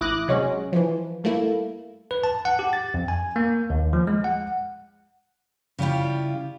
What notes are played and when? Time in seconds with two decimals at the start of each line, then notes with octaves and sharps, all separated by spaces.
0.01 A1 E4 D6 D#6 F#6 A#6
0.28 C3 F#3 G#3 C#4
0.72 E3 F3
1.24 G2 A3 A#3 E4
2.11 B4
2.24 A5
2.45 F#5
2.59 G4
2.73 A6
2.94 F2
3.08 G#5
3.36 A#3
3.70 D#2
3.93 F3
4.07 G#3
4.24 F#5
5.79 C#3 G3 E4 F4 G4